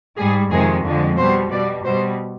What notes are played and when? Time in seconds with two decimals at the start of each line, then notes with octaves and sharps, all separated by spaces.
0.17 G#2 G3 G#4
0.50 F2 C3 D#3 G#3 G#4
0.84 F2 D3 F3 G#3
1.17 B2 G3 C5
1.50 B2 G3 D5
1.83 B2 G3 C5